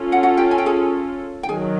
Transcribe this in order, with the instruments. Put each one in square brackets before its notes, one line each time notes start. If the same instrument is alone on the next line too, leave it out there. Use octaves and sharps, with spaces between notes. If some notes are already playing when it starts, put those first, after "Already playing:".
Already playing: [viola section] C#4 F4 A4
[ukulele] F#4 F#5
F#4 F#5
G4 G5
G#5
G5
G#4 G#5
G5
[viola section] D#3 F#3 [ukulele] G#4 G#5